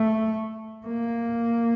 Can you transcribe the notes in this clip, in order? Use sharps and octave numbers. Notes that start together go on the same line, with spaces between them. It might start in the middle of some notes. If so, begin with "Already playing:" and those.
Already playing: A3
A#3